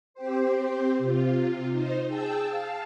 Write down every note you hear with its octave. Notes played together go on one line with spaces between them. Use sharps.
C4 G4 C5
C3 F4
D#4 C5
G#4 G5 A5 E6
F5 A5